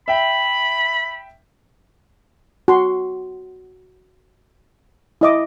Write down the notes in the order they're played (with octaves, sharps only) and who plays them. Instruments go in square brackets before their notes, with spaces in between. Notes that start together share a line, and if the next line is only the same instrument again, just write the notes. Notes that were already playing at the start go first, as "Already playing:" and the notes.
[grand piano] E5 G5 [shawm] B5
[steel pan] F#4 C6
E4 D#5 D6